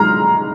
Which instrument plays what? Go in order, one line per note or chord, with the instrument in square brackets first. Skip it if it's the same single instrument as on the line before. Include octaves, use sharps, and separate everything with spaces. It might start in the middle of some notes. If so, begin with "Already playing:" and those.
Already playing: [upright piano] G#3 A#5 F6